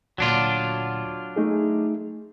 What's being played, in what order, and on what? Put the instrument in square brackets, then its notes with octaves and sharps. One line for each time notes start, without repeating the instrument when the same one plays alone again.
[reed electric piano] D2 A#2 [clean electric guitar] F#3 D4 F4
[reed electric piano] A3 D#4 G#4